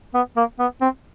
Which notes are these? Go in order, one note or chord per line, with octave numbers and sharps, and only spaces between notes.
B3
A#3
B3
C4